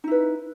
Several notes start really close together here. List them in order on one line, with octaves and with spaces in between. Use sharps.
D#4 E4 B4